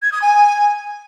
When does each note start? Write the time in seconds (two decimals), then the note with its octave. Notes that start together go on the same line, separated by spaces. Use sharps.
0.02 G#6
0.12 D#6
0.21 G#5